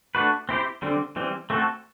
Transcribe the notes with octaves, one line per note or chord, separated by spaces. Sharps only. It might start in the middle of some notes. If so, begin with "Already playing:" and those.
A3 D4 F#4 B4
C4 E4 G4 C5
D3 G3 C4
E3 G3 C4
A3 C4 F#4 A4